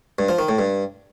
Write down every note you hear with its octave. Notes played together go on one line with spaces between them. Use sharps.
G2
F3
D#3
A2
G2